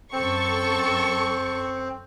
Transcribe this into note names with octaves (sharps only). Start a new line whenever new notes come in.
F#2 C4 A4 C#6